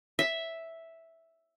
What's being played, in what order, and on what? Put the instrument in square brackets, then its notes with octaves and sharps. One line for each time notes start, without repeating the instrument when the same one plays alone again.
[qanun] E5